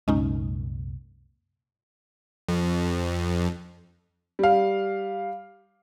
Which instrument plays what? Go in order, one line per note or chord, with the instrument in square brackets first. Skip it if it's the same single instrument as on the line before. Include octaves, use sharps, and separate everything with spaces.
[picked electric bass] C2 F#2 A#2 [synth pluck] G#3 C#4 D#4
[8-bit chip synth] F2
[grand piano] G3 F5